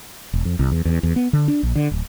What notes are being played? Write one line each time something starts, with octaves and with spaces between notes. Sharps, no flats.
E1
F2
C2
E2
E2
E2
B3
D3
D4
A#1
D3
D1